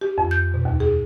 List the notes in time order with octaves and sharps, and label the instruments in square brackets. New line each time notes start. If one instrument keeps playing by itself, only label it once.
[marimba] G4
F2
G6
B2
D#2
G#4